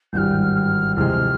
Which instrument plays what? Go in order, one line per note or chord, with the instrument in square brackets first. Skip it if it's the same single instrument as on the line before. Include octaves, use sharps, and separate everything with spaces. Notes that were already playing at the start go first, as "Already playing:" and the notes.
[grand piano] G#1 G2 E3 G3 [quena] F6 G6
[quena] F6
[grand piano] F2 C3 E3 G#3 [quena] F6